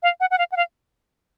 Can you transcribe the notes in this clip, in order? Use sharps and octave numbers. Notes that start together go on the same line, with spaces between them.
F5
F#5
F#5
F5
F#5
F5